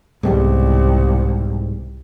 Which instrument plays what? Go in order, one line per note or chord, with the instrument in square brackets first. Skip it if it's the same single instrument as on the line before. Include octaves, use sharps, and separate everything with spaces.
[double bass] C2 [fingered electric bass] G#2 B2 G3